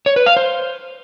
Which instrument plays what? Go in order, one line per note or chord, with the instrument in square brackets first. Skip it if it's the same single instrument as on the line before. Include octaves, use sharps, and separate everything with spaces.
[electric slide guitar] C#5
B4
F5
C5